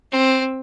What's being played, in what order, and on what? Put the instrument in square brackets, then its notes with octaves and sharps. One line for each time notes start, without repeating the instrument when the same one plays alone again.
[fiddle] C4